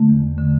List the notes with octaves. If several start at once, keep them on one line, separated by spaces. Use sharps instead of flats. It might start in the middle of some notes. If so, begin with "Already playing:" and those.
Already playing: D3 A3
E2
E2
D3